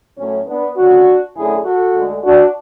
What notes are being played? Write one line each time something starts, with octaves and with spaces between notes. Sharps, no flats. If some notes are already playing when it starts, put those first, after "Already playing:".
A2 F#3 A3 C#4
B3 D4
D2 C#3 F#3 D4 F#4
F#2 D3 F#3 A3 E4 G#4
F#4 A4
D2 D3 G#3
D4 F#4